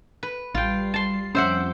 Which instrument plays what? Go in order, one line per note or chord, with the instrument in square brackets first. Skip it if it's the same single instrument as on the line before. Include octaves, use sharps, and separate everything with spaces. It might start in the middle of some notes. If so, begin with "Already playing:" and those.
[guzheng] B4
[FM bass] A1 [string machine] G3 C7 [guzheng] F4 G5
[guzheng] A5 C6
[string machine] F2 G5 D6 [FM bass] C#4 [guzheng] C5 E5 F#5